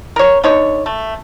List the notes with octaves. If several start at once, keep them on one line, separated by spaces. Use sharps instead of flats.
A#4 C#5
D3 D#4 C#5
A3